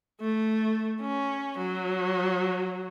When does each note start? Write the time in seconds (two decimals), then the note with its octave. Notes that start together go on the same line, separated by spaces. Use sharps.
0.21 A3
1.01 C#4
1.58 F#3